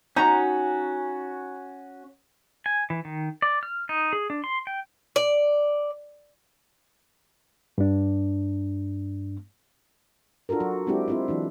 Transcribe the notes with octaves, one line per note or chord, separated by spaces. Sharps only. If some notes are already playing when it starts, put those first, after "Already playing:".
C#4 D#4 F#4 A#5
G#5
E3
D#3
D5
F6
D#4
G#4
D4
C6
G5
D5
G2 D4
D4 F4 F#4 A4 A#4
F#3 F#4
F#3 G#3 C4 D4 E4 G4
C4 E4 F4
E3 F#3 D4